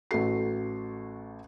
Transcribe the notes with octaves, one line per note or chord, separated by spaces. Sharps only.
A1 F#4 A4 C7